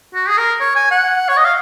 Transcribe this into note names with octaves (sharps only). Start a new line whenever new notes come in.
F#4
G#4
A#4
C#5
G#5
F#5
C#5
D#5
F5